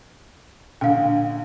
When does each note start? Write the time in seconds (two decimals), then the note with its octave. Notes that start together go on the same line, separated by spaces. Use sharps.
0.81 A#1 D3 F5 G5